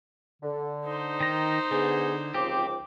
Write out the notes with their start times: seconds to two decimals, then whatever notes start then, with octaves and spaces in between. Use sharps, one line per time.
0.42 D3
0.85 D#4 C5
1.21 D#3 A#5
1.71 D3 B3 G#4
2.34 C#2 F3 C4 G4 D6